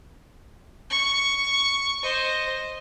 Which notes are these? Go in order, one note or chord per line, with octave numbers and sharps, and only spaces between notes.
C#6
C5 D#5